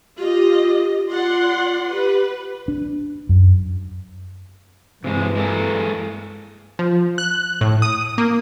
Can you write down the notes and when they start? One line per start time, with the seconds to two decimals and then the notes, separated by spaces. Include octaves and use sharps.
0.19 F4 G4 D#5
1.09 F4 D5 F#5 C6
1.91 G4 B4
2.68 D4
3.29 F#2
5.04 G2 C3 E3 G#3
5.36 G#3 A#3 A4
6.79 F3
7.18 F#6
7.61 A2
7.82 D#6
8.18 A#3